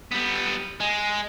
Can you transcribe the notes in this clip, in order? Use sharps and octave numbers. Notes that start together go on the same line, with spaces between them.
G3 B3
G#3